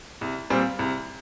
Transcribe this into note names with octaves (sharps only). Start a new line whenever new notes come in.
C2
A#2 G3 C4
C2